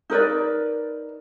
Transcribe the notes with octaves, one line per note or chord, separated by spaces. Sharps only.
D#4 A#4 B4 D5